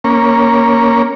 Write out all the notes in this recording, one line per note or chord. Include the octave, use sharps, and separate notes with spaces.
A#3 C#4